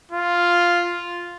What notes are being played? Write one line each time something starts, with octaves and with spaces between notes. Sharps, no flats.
F4